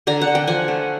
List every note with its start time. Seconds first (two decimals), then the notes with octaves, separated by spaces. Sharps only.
0.07 D3 G#5 A#5
0.21 F#5
0.27 D3
0.35 G5
0.47 F3 F#5 G#5
0.68 A3